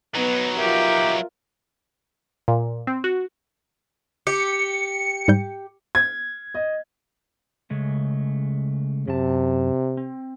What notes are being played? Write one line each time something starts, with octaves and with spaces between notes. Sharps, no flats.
F#3 B3 D#4
F4 G4 A#4 E5
A#2
C4
F#4
G4 C#7
G#2 G3 G6
G#6
D#5
C#3 G#3 A3
F#2 C3 A5
C4